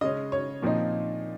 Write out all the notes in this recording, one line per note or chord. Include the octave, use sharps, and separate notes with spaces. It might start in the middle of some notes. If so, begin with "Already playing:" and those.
C#3 G#3 C#4 D#5
C#5
A#2 F3 C4 D#4